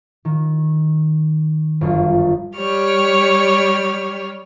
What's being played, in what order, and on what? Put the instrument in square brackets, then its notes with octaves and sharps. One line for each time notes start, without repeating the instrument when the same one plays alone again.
[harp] D#3
G1 F#2 F4
[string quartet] G3 G4 C#5 F6